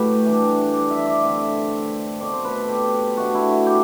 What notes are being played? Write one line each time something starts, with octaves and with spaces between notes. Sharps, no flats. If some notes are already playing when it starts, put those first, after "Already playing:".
Already playing: A2 F#3 A3 G4 B4
E3 G3 D4
D5
E5
D5
D3 A3 C4 E5
B2 A3 C4 D5
C5
B4
A4
G4
B2 A3 D4 F#4
E4
F#4
G4